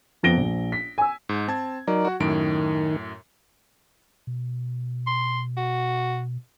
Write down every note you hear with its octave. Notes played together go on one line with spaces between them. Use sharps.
F2 F3 B3 A#6 D7 G7
A#1
B6
G#5 E6
G#2
C4 A5 G#6
F#3 D#4 A#4 D5
F#4 F#5
F#2 A2 D#3 D7
B2
C6
F#4